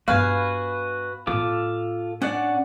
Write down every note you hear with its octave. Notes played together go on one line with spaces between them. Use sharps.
G2 B3 F#4 B4 F5 G#5
A2 B3 F4 A4 D6
C#4 D4 D5 F#5